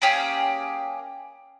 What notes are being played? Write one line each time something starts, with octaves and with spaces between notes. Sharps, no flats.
A#3 C#4 G4 G#4